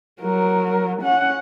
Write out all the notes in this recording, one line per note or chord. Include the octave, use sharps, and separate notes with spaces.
F#3 A#4
C#4 F#5